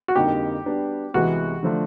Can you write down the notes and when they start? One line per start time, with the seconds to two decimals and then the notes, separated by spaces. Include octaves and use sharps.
0.08 F#4
0.16 F2 D3 G3 A#3 D#4 G4
0.65 G3 B3 D4
1.14 C2 C3 E3 G#3 B3 F#4
1.63 D3 F3 A3 D4